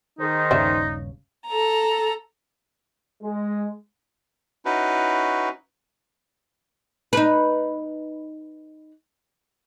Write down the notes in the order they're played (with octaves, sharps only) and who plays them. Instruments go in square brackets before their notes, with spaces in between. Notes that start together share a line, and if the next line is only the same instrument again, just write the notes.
[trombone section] D#3 G#4 C5 [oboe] D#4
[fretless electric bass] D#1 G2 C#3 [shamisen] B4 D5 E5
[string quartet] A4 A#5
[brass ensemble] G#3
[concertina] C#4 D#4 E4 F#4 B4
[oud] D#4 B4